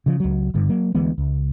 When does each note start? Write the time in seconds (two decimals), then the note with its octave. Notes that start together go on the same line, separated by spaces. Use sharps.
0.06 C#3 F3
0.20 C#2 F#3
0.54 F#1 G2 D3
0.69 F#3 A#3
0.95 D2 E3 G#3 B3
1.18 C#2